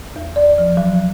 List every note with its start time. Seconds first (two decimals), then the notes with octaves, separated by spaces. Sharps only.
0.16 E2
0.36 D5
0.58 F3
0.77 F#3